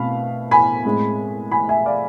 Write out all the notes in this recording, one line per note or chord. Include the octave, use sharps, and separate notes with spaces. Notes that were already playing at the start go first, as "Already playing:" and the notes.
Already playing: B2 A3 C4 F5 B5
G#5 B5
A2 G#3 C4
G#5 B5
E5 G#5
D5 F5